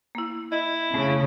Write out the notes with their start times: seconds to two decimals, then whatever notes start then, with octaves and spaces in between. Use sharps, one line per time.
0.15 A#3 E4
0.52 E4 D#5
0.94 F2 C#3 A3